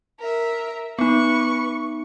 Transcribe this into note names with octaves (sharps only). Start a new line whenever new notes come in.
A#4 E5
B3 D#4 B4 C#6